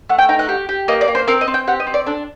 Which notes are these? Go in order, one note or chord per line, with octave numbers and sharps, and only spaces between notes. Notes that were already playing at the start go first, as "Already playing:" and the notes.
A3 F#5
G5
D#4 G5
F#5
G4
G4
A#3 D#5
D5
A#3
C5
C4 A#4
D#5
C4
G5
G4 F#5
D#5
C4
D5
D4 A4